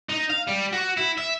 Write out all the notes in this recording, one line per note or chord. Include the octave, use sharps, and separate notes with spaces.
D#4
F5
G3
F#4
E4
E5